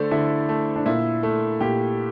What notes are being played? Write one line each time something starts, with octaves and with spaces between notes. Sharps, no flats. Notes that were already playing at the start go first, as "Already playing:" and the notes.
Already playing: D3 A3 C5 D5
D3 E4
A3
D4
A#2 E4
A3
A#2 G4